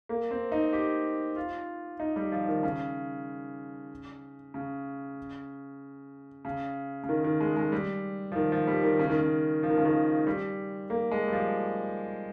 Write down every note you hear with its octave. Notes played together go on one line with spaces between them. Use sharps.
A#3
C4
D#4
G4
F4
D#4
G3
F3
D#3
C#3
C#3
C#3
C#3
D#3
D#3
G#3
G#3
G3
F3
D#3
F3
G3
D#3
C#3
D#3
C#3
F3
D#3
C#3
D#3
G3
A#3
G#3
G3
F3